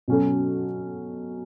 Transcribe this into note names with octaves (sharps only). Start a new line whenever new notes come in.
B2 F#3 C#4 F#4 A4